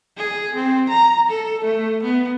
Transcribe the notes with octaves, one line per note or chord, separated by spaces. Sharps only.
G#4
C4
A#5
A4
A3
B3